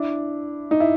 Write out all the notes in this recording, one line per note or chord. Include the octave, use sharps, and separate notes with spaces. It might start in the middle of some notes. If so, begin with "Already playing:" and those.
Already playing: D4 E4
D#4
E4